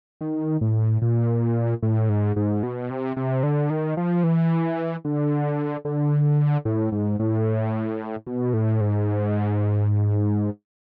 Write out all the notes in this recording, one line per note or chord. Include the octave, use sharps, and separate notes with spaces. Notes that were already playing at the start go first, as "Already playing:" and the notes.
D#3
A2
A#2
A2
G#2
G#2
B2
C3
C3
D3
D#3
F3
E3
D3
D3
A2
G#2
A2
B2
A2
G#2